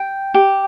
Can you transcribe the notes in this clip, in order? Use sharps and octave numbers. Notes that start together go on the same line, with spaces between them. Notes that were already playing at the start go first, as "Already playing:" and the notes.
Already playing: G5
G4